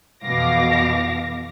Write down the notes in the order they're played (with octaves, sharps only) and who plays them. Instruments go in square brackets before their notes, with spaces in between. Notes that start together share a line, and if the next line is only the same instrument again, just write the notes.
[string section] F2 B2 E3 F5 D6 A#6